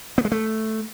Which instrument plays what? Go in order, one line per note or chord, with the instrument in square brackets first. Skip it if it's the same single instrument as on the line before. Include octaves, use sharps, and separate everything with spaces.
[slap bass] B3
G#3
A3